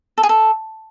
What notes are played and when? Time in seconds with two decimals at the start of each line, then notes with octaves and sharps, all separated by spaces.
0.18 A4
0.23 G#4
0.29 A4